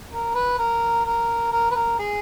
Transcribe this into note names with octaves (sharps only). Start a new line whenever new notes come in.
A#4
B4
A#4
A#4
A#4
B4
A#4
G#4